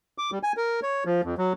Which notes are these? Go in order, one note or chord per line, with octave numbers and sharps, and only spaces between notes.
D6
G3
G#5
A#4
C#5
F3
F2
F#3